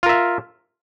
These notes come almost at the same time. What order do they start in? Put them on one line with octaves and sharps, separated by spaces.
F4 A#4 E5